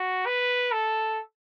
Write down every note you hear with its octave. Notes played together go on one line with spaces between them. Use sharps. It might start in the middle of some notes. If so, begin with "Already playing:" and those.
Already playing: F#4
B4
A4